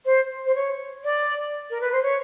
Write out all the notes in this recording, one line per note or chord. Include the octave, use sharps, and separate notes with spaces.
C5
C5
C#5
D5
A#4
B4
C5
C#5